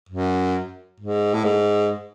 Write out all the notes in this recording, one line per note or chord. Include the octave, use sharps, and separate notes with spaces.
F#2
G#2
A2
G#2